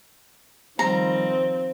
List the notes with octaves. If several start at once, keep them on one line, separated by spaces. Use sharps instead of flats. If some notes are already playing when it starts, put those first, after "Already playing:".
D#3 F3 G3 C4 A#5